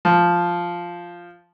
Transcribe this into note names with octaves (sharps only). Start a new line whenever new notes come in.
F3